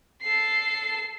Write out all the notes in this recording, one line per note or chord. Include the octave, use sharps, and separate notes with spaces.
A4 C7